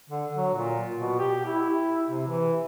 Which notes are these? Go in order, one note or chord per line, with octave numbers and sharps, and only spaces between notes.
D3
F#3
A#2
B2
G4
E4
C3
E3